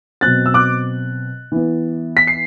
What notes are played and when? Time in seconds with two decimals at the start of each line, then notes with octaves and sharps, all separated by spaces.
0.21 B2 F#3 C4 F#6 A6
0.46 E6
0.54 D6 F#6
1.52 E3 B3
2.17 B6
2.27 C7